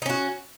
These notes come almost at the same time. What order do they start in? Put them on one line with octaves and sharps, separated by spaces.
D#4 C#4 F#4